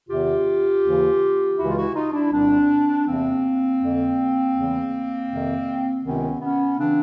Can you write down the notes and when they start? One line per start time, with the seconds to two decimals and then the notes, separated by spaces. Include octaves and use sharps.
0.09 E2 C3 D#3 F4 G4
0.83 D#2 C#3 E3
1.58 C#2 C#3 E3 E4 F#4
1.70 F4
1.76 E4 F#4
1.95 D#4 F4
2.13 D4 E4
2.31 C2 A#2 C4 D4
3.06 E2 C3 E3 A#3 C4
3.81 F2 D3
4.55 E2 C#3 E3
5.30 F2 C3 D#3
6.04 C#2 C3 D#3 B3 C#4
6.41 B3 C#4
6.78 C#3 E3 C4 D4